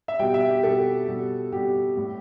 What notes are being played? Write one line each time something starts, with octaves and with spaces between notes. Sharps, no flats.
E5
B2 G3 G5
E5
G4
B2 G3 A4
B2 G3
B2 G3 G4
A2 G3